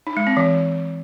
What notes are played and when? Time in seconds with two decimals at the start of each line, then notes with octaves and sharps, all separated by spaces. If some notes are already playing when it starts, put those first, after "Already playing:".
0.07 D#4
0.17 G#3
0.27 C4
0.37 E3